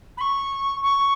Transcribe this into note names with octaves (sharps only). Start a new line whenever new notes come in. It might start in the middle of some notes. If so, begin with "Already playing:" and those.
B5
C#6
C#6